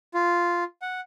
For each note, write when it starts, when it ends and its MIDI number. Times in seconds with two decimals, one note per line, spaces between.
0.14 0.64 65
0.82 1.01 78